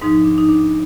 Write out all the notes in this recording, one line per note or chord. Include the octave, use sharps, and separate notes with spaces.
G#2 F3 D#4
D4
D#4
D4